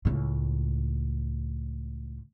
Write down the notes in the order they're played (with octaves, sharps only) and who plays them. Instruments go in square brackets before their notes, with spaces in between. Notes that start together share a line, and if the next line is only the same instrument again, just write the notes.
[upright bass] C#2 A2